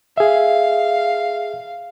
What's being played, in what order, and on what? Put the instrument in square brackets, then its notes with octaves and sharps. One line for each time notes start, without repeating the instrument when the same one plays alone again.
[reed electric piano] G#4 E5 [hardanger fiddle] F5